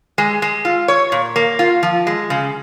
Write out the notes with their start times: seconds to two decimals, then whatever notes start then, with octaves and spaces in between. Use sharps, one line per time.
0.18 G#3
0.42 G#3
0.65 F4
0.88 C#5
1.12 A#2
1.36 A#3
1.59 F4
1.83 F3
2.07 G#3
2.30 C#3